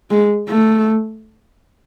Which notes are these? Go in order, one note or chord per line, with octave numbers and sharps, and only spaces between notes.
G#3
A3